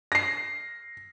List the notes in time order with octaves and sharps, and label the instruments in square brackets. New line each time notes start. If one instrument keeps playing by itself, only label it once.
[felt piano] A#6 C7